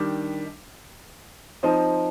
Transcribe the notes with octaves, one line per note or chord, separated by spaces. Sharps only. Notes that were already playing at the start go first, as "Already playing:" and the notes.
Already playing: D#3 G3 D4
F3 C4 D#4